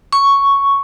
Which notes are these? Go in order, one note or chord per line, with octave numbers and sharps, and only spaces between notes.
C#6